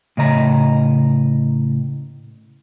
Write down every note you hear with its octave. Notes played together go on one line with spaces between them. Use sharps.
A2 C#3 D#5 A#5